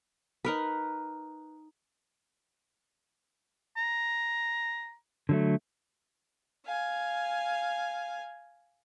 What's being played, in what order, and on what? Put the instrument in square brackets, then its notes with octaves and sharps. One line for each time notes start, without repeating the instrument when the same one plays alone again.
[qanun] D#4 A#4 B4
[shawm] A#5
[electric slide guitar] D3 F#3 A3
[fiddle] F5 G#5